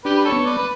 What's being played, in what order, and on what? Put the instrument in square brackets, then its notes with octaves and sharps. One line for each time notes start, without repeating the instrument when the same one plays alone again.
[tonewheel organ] D4 [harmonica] G4 B4
[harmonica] B4
A4 C#5
[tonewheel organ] B3
[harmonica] B4 D5
B4